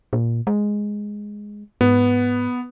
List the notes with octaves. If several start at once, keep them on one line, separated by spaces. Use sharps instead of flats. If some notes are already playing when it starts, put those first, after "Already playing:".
A#2
G#3
G#2 B3